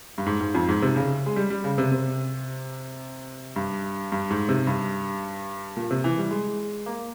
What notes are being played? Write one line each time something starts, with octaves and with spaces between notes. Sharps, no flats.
G2
G#2
G#2
F2
G#2
C3
C#3
G#3
G3
G3
C#3
C3
C3
G2
G2
G#2
C3
G2
A#2
C3
E3
G3
G#3
A#3